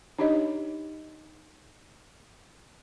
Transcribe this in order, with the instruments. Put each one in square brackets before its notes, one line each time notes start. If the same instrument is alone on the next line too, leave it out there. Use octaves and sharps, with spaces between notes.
[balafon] D4 D#4 G4 C#5 D#5